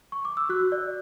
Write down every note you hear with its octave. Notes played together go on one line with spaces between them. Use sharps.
C#6
D6
E6
F#4 F#6
D5